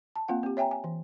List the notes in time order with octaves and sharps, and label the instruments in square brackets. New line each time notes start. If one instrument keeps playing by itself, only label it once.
[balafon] A5
A#3 C4 F4 F#5
C4 G4
C#5 E5 G5 G#5 A#5
G#5
E3